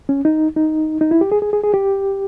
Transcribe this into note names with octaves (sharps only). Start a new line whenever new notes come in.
C#4
D#4
D#4
D#4
E4
G4
G#4
G#4
G#4
G#4
G4